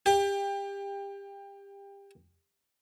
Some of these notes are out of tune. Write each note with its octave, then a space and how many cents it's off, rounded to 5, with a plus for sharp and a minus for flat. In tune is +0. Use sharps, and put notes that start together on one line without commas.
G4 +25